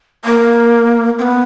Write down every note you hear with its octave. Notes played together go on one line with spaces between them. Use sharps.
A#3
C4
B3